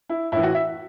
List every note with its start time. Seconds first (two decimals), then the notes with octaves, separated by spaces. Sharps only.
0.09 E4
0.32 A2 E3 E4
0.43 F#4
0.55 E5